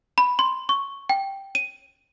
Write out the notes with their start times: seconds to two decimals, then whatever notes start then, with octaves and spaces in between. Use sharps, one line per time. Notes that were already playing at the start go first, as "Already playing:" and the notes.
0.18 B5
0.39 C6
0.69 C#6
1.09 G5
1.55 D#7